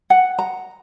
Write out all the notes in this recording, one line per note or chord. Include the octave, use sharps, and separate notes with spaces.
F#5
A#5